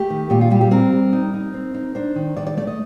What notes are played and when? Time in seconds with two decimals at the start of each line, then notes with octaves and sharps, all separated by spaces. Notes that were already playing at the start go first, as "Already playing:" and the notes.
Already playing: A3 G4
0.10 D#3
0.30 A#2 G4
0.41 F4
0.50 G3 G4
0.61 G4
0.71 C4 A#4
0.92 G3
1.13 D#4
1.34 D#4
1.54 C4
1.74 D#4
1.95 D4 C5
2.16 D#3
2.37 D#3 D5
2.47 D5
2.57 A3 D5
2.67 D#5